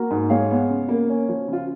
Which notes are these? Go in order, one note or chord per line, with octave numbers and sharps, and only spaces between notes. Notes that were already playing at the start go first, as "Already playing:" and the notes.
Already playing: A#3 F#4 A#4
G#2
G#3 C#5 F5
B3
C#3
A#3
C#4
F3
C#3 F4